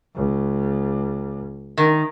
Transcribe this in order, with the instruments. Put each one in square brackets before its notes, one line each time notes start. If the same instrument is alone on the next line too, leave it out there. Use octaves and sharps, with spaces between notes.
[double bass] C#2
[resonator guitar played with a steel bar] D#3